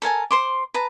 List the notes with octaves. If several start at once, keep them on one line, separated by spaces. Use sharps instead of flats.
A4 A#4 G#5 A5
C5 C6 D6
B4 A5 A#5